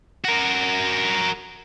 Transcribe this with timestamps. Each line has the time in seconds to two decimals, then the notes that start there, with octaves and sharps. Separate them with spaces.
0.25 F#4 A#4